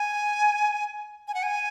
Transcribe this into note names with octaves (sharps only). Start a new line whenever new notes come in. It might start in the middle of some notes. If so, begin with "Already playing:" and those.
Already playing: G#5
G#5
F#5
G#5